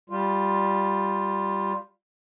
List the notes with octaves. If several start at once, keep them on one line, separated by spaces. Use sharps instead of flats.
G3 F4